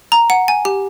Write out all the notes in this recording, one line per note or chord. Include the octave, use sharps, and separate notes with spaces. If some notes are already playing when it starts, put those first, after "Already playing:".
A#5
F#5
G#5
G4